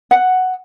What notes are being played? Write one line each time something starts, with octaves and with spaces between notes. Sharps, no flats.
F#5